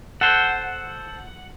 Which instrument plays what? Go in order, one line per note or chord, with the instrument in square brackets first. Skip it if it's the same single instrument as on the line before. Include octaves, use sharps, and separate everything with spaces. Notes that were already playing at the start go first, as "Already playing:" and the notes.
[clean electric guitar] A4 C5 [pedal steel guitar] F#5